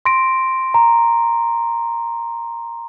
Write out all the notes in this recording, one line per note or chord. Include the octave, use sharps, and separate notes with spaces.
C6 A#6 D7
A#5